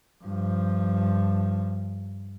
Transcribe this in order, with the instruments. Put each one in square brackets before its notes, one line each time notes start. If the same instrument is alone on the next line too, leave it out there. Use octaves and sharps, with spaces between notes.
[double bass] G2 F3